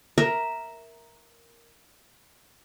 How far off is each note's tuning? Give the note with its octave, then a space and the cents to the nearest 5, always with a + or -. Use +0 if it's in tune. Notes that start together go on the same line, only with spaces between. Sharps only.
A#4 +0 E5 -5